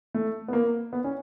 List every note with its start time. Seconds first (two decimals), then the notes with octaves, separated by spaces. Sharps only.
0.14 A3
0.48 B3
0.53 A#3
0.93 B3
1.04 C#4